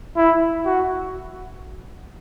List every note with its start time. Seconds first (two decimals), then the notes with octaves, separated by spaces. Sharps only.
0.17 E4
0.65 F#4